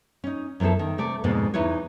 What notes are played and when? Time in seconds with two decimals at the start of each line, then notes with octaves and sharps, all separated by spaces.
0.24 C#4 D#4
0.60 F#2 F3 B3 E4 A4
0.79 D#3
0.98 C3 A3 D5
1.24 F2 G#2 B2 G#3 A#3 D4
1.54 E2 D#4 E4 B4 C#5